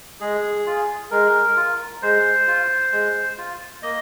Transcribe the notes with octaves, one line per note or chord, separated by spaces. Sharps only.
G#3 G#4
F4
G#3 A#4
F4
G#3 C5
F4
G#3
F4
A#3 D#5